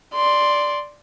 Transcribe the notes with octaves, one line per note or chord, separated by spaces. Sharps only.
D5 C6